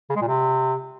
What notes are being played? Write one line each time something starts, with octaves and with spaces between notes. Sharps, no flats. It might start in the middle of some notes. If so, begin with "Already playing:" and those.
C#3
G#3
A#2
C3